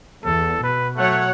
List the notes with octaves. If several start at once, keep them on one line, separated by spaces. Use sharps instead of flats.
E2 A4
B2 B4
F#3 A3 C#5 F#5